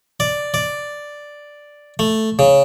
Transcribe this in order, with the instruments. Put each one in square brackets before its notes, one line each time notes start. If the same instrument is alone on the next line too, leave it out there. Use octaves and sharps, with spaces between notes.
[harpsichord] D5
D5
A3
C#3